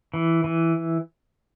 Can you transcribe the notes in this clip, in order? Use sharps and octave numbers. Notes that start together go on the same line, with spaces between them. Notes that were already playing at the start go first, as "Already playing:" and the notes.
E3
E3